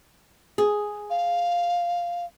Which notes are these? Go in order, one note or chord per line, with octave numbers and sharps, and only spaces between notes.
G#4
F5